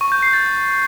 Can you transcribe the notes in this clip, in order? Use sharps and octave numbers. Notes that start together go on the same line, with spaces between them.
C#6
G6
C7
A6